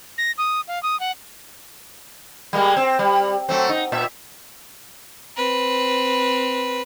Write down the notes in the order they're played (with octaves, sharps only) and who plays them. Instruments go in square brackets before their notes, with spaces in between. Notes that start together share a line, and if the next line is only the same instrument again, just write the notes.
[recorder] A#6
D#6
F5
D#6
F#5
[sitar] G3 G#3 A#3
C4
G3
F#3 A3 C4
D#4
A#2 E5
[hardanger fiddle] C4 B4